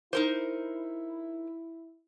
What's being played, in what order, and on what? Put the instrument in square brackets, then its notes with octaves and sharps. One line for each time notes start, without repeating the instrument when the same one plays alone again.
[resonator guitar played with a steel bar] D#4 A#4 C5 [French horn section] E4